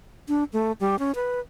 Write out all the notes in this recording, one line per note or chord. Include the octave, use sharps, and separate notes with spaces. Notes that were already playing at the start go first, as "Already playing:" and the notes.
D4
A3
G3
C#4
B4